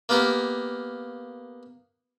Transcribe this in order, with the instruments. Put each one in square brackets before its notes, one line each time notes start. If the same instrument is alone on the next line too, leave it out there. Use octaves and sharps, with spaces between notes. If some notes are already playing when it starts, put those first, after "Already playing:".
[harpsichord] A#3 B3 G4 A#4